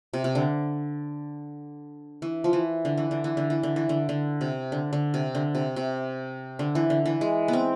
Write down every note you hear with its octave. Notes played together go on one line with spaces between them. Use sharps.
C3
C3
D3
E3
F3
E3
D3
E3
D3
E3
D3
E3
D3
E3
D3
D3
C3
D3
D3
C3
D3
C3
C3
D3
E3
D3
E3
G#3
B3
C4